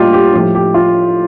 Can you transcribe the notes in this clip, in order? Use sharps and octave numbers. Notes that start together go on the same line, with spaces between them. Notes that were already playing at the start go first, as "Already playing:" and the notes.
Already playing: A2 G3 A#3 F4 G4 D#5
G4
A2 F3 A3 G4
G4
F4